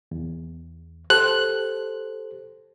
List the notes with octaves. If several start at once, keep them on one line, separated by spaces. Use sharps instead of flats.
E2
G4 A4 C5 F#6